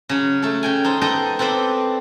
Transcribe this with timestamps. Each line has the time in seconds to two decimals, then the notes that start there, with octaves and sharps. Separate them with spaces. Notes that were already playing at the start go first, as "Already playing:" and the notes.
0.09 C#3 F#3
0.42 A3 A4
0.63 C#3 G5 G#5
0.84 D#4 A4 C5
1.01 B3 D#4 A4 D#5 G5
1.39 C4 A4 B4 C5 D5